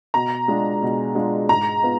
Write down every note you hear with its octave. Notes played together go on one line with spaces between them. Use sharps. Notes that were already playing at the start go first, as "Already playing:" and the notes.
B2 A#5
G#3 D4 F4
B2
G#3 D4 F4
G#2 A#5
B3 F4